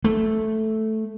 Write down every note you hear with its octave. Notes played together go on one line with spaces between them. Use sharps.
A3